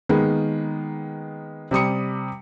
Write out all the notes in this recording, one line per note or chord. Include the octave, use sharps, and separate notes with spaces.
D#3 G#3 A#3 B3
C3 G3 D#6 C#7